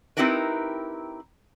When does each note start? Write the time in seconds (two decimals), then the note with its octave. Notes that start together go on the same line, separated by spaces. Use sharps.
0.17 C4 D#4 E4 G4 A#4 B4